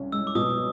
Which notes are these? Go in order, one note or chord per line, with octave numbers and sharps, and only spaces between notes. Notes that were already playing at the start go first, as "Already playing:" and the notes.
Already playing: C2 C#4
G#3 E6
D6
B2 D#6